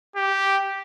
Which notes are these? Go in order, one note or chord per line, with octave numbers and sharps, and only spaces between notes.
G4